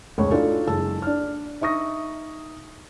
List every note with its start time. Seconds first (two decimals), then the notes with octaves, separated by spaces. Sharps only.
0.18 F1 C#2 A2 C#3 C#5 C#6
0.31 D4 D#4 F4 F#4 A4
0.67 F#1 G#3 A5 E6
1.02 D4 F6
1.61 D#4 E5 C#6 D#6 A#6